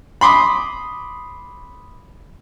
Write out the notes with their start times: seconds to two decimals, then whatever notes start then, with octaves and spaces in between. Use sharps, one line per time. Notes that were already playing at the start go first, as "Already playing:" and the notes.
0.21 B5 C6 D6 D#6